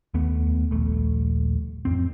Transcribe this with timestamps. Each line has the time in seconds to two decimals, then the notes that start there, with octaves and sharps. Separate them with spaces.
0.14 D#2 A3 B3
0.71 D#1 A#1 A3
1.85 A1 F2 C4